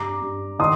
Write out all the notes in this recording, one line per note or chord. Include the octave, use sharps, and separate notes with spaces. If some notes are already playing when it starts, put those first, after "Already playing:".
Already playing: G2 A#5 D6
G2
D#3 C6 D#6